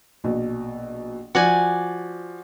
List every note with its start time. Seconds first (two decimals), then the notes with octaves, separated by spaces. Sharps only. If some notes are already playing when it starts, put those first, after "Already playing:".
0.24 A#1 B2
1.35 F3 F#4 D5 G#5